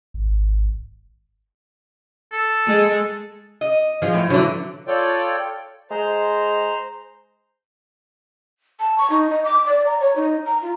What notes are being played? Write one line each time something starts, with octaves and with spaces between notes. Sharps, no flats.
G#1
A4
G#3
D#5
F3 G#3 F4
A2
D3 E3 F#3
F4 A4 C#5 D5 G5
G#3 C5 A#5
A5
C#6
D#4
D#5
D6
D5
A#5
C#5
D#4
A#5
F4